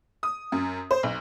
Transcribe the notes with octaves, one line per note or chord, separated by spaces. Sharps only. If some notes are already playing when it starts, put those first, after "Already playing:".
D#6
F#2
C5
B1